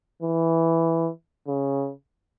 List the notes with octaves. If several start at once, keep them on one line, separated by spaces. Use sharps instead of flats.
E3
C#3